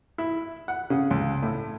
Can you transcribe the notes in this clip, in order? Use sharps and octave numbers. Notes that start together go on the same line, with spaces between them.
E4
F#5
C#3
C#2
A2